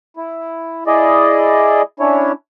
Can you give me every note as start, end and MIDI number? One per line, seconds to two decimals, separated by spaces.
0.17 0.84 64
0.87 1.82 64
0.87 1.82 68
0.87 1.82 74
0.87 1.82 75
2.00 2.32 61
2.00 2.32 62
2.00 2.32 64
2.00 2.32 73